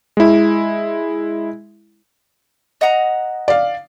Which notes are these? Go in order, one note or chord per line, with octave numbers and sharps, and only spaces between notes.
G#3 E4
D#5 F#5 A#5
D5 F5